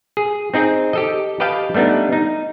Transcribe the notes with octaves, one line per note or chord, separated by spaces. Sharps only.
G#4
C4 D#4 G#4 G5
G4 A4 D#5
G4 B4 D#5 F5 G5 A5
G3 A3 B3 D4 D#4
D#4